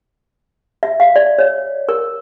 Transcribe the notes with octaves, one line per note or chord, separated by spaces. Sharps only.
E5
F5
D5
C#5
A#4